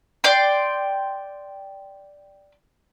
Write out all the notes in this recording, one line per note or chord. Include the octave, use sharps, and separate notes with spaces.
D5 G5 C6